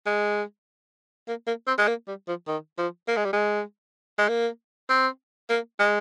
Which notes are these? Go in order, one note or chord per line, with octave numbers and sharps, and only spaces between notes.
G#3
A#3
A#3
C4
G#3
A#3
G3
F3
D#3
F3
A#3
G#3
G3
G#3
G#3
A#3
C4
A#3
G#3